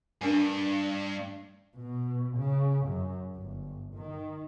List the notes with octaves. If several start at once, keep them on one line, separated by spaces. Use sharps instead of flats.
G2 D4 A#4 G#5
B2
C#3
F#2
G1
D#3